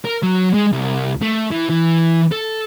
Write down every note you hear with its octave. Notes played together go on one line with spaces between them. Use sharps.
A#4
F#3
G#3
C2
A3
E3
E3
A4